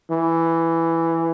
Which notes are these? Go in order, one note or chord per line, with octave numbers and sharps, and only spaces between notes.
E3